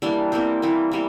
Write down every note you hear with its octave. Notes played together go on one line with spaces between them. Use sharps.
E3 G3 A#3 D4
E3 G3 A#3 C4
E3 G3 A#3
E3 G3 A#3